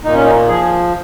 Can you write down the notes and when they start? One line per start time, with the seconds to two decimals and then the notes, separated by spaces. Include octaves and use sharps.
0.05 A#2 D#4
0.14 C#4
0.24 D#4
0.48 F3 G#4